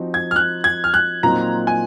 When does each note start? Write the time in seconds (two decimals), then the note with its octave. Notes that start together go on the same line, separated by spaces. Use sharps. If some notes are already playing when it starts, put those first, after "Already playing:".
Already playing: F3 C4 D#4 F#4
0.14 G#6
0.31 F6
0.36 F#6
0.64 G#6
0.84 F6
0.94 F#6
1.23 A#2 F#3 C4 D#4 A#5
1.67 G#5